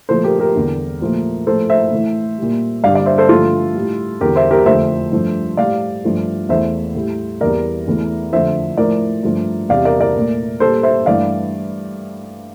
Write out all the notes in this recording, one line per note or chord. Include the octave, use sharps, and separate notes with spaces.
A#2 F3 A3 A4 C5
G4 A#4
G4 A#4
E2 D3 G3
A#2 F3 A3
A2 F3 A3 A4 C5
C5 E5
A2 E3 A3
A#2 G3
G2 D3 G3 D5 F5
D5 F5
C5 E5
A4 C5
G2 D3 F3 A3 F4 A4
A2 G3
E2 D3 G3 G4 A#4
C5 E5
G4 A#4
F2 D3 F3 A3 C5 E5
G2 F3 A3
A2 G3 D5 F5
G2 F3 A3
E2 E3 A3 C5 E5
A2 G3
E2 E3 G3 A#4 D5
E2 E3 A3
F2 D3 F3 A3 C5 E5
A2 F3 A3 A#4 D5
G2 F3 A3
E2 C3 G3 D5 F5
A#4 D5
A#4 D5
A#2 A3
A#2 G3 A4 C5
C5 E5
G2 E3 A3 D5 F5